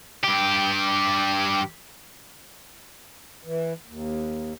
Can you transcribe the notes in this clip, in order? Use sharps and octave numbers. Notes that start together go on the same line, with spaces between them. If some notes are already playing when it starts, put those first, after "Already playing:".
G2 G4
E3
D#2